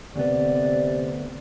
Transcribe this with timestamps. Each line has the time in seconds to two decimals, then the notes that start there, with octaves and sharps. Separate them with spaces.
0.16 D2 C3 B3 D5